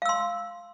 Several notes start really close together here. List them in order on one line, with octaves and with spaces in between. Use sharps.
F5 E6 C6